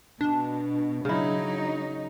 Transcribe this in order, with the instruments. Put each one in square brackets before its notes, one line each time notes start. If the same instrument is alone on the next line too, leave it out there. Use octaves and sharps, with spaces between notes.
[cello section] B2 [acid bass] D4
[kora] C#3 E4 [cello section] F#3 D#4